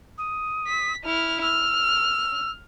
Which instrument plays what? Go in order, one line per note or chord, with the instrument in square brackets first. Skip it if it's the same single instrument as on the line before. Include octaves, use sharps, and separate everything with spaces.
[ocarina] D#6
[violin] B6
E4 F6
[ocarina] E6 [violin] F6